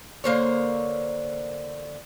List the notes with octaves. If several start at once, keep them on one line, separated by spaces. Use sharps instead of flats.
D3 A#3 C5 C#5